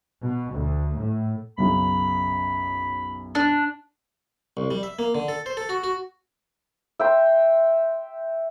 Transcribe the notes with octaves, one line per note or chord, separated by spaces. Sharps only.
B2
D2
A2
B1 F#2 C#3 B5
D4
C2
G3
E5
A#3
D3
A4
C5
A4
F#4
F#4
E5 G5 C6